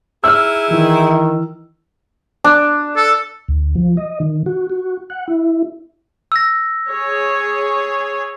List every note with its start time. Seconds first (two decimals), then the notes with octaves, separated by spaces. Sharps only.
0.24 D#4 E4 G#4 E6 F6
0.70 D#3 E3
2.44 D4
2.96 A4
3.48 D2
3.75 F3
3.97 D#5
4.20 D#3
4.46 F#4
4.70 F#4
5.10 F#5
5.28 E4
6.32 E6 A#6
6.89 G#4 C#5